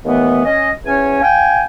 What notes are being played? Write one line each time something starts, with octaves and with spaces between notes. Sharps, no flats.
D#2 E3 A3 B3
C#4 D#5
E2 C#4 C#5 G#5
F5 G5 G#5